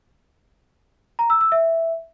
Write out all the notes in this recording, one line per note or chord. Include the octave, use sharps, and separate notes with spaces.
A#5
E6
E6
E5